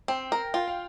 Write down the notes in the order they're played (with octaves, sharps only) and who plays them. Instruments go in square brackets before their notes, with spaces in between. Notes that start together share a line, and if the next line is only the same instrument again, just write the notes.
[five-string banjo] C4 [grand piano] G5
[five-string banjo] A#4
[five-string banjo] F4 [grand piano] G5
[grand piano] F5